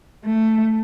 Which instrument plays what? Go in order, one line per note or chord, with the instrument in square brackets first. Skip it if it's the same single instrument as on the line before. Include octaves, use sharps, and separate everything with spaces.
[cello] A3